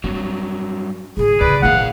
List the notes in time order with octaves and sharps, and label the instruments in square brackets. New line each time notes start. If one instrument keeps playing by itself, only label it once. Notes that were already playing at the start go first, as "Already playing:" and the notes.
[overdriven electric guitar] G2 F#3 [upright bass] C4
[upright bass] A2 D3 [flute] G#4
[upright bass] D2 C#3 [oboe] B4 [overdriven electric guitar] D5
[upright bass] A#1 D#3 [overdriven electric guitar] C3 F5 [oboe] F#5